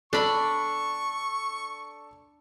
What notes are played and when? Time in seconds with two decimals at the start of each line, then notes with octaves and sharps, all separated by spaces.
0.13 D4 A4 D5 B5 C#6